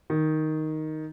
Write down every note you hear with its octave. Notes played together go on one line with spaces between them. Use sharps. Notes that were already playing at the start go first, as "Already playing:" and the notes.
D#3